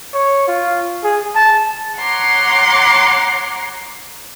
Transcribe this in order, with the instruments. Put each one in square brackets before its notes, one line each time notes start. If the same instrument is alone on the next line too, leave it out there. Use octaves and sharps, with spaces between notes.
[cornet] C#5
F4
G#4
A5
[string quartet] C#5 F#5 A#5 C6 D6